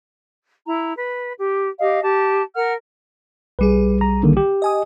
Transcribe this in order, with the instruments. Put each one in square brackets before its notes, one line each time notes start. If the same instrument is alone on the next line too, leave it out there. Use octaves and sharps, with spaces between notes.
[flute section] E4 A#5
B4
G4
G4 D#5 F5
G4 A5
A#4 F#5 F6
[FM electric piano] B1 G3 G#4 [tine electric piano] B4
[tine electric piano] A#5
D3 D#3 A#3
G4
[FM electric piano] D#5 G#5 D#6